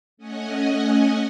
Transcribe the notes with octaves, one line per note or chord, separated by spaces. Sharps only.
A3 C#4 D#5 F#5 G#5